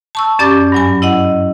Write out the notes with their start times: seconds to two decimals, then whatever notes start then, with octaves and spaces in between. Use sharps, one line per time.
0.15 A5 C#6 E6
0.39 F#2 C#4 G4 D5 D6 A6
0.72 G2 F#3 G#5
1.02 E4 D#5 F#5